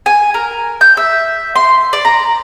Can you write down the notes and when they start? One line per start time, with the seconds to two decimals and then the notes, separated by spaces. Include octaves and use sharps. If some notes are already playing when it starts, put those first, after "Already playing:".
0.06 G#5
0.34 A#4
0.81 G6
0.97 E5
1.56 C6
1.93 D5
2.05 A#5